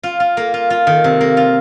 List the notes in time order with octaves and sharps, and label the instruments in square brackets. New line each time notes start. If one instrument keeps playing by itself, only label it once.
[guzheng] F4
F4
A#3
F4
F4
D#3
C3
A#3
F4